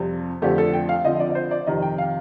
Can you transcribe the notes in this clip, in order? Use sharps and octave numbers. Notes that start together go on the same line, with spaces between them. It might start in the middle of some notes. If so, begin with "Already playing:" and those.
Already playing: F2 C3 G3 C4
F2 D3 F3 A3 G4
A4
G5
F5
D3 F3 C4 D#5
D5
D5
C5
D5
F2 C3 D#3 D#5
G5
F5